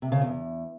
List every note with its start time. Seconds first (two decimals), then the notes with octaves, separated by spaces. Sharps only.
0.02 C3
0.12 C#3
0.21 E2